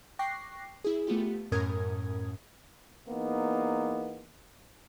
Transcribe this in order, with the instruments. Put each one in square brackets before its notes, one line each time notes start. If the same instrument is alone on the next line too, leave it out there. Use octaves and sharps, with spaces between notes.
[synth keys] G5 C#6 D6 F#6 A#6 C7
E4 G#4
A3 B3 F4 G4
F#2 A2 C#4 A#4 D#6 G#6
[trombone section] E2 A#3 B3 D#4